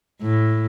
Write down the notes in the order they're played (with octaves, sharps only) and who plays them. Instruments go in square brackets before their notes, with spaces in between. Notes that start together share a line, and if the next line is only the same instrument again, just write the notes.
[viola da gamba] A2